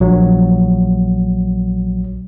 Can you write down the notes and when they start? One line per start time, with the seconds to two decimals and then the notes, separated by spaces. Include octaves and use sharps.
0.01 A#1 F#3